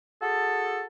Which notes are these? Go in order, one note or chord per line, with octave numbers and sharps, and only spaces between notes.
F#4 G#4 A4